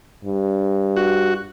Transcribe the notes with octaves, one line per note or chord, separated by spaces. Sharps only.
G2
F#4